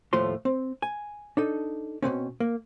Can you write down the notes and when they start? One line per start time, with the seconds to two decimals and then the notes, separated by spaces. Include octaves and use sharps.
0.13 D#2 A2 F3 A3 F4 C6
0.45 C4
0.82 G#5
1.37 D4 D#4 A4
2.02 B2 D3 C4 C#4
2.40 A#3